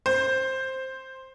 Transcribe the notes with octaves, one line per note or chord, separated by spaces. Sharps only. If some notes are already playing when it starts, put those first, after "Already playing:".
C5